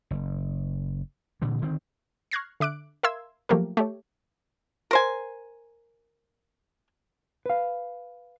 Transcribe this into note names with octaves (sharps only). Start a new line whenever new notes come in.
F#1
A#2 D3 E3
D3 D#3 C4
C#6 F6 F#6 G#6 A#6 C7
D3 E5 D6 F#6 D7
A#4 E5 F5 C6 E6 G#6
F3 F#3 A3 A#3 G4 A#4
A3 G4 C#5
A#4 C5 G#5
B4 F5